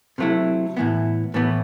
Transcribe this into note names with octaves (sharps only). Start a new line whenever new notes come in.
C3 F#3 A3 E4
A2 E3 B3
A2 E3 B3